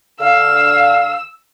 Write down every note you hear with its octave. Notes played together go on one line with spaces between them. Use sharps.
D3 D4 F5 E6